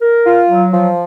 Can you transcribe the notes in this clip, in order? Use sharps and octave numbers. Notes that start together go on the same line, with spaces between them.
A#4
F4
F#3
F3